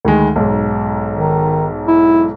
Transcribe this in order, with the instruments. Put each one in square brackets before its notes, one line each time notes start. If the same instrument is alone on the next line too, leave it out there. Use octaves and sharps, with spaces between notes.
[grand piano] D2 D#3 G#3
B1 G#2
[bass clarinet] D#3
E4